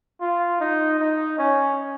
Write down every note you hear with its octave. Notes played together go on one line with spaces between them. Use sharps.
F4
D#4
D#4
C#4